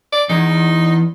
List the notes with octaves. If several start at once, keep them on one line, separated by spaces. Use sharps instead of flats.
D5
E2 D#4